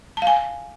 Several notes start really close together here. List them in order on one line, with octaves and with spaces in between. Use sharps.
A5 F5 G#5